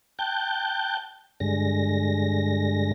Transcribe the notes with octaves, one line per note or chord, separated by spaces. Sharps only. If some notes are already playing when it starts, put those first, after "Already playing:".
G5 A5 F#6 G6
G2 D3 G#3 A#6